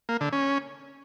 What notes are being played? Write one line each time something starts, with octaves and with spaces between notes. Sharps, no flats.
A#3
D3
C#4